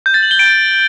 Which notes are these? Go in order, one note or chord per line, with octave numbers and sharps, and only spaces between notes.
G6
A6
F#7
G7
D7